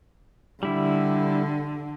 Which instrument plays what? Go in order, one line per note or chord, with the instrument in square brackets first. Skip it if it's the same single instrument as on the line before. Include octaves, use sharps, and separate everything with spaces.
[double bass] D3 [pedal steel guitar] G3 E4